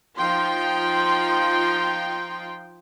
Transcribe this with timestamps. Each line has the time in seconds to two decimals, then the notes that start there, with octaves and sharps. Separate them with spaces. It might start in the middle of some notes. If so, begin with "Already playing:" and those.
0.18 F3 D#4 F4 G5 C6